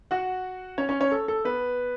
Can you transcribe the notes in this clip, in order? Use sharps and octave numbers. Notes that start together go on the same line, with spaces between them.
F#4 F#5
C#4 C#5
C#4 C#5
C#4 C#5
A4
A4
B3 B4